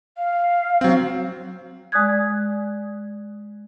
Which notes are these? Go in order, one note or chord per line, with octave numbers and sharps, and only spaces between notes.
F5
F#3 C4
G#3 D5 D#6 F#6 G#6